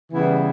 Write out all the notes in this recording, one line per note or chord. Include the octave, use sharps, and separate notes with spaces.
C#3 E3 G3 B3 E4